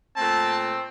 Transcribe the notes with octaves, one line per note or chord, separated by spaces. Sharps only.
A#2 A3 C4 A5